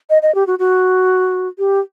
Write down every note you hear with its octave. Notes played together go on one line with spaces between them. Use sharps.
D#5
D#5
G4
F#4
F#4
G4